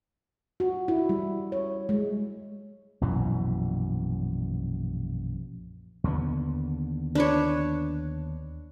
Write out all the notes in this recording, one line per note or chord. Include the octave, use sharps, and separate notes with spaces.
F#4
E4
G3
C#5
G#3
A#1 F#2 B2 E3
D#2 D3 B3
D4 B4 C#5